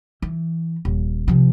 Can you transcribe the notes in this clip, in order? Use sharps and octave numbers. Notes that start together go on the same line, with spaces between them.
E3
D#1
C3 F3